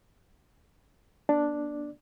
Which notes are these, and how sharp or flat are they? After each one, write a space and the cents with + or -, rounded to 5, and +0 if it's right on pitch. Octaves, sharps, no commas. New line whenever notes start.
B3 -45 D4 +0 D5 +0